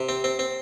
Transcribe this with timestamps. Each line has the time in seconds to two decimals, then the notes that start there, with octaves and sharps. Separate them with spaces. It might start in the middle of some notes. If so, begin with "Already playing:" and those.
Already playing: C3
0.09 C4
0.24 C4
0.39 C4